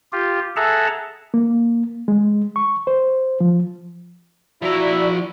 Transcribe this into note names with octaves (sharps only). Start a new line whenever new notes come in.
F4 G4
G#4 A4 E5 F#5 A5 A#5
A#3
G#3
C#6
C5
F3
F3 E4 F#4 D5 A#5